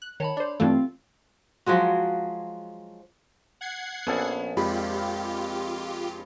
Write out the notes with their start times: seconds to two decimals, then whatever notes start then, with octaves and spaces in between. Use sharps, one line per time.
0.02 F#6
0.20 D#3 C#5 A5 B5
0.37 D4 C5
0.60 G2 E3 A3 C4 F4 F5
1.66 F3 F#3 G#3 F#4
3.61 F#5 G#6 C7
4.07 A#1 B3 C#4 A4 G#5
4.57 F2 G#3 F4 G4 B5